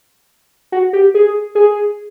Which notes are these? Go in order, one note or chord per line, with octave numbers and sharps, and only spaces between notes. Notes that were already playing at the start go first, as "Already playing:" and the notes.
F#4
G4
G#4
G#4